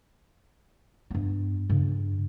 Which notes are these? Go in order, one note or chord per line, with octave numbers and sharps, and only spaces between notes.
G2 B3
G2 C#3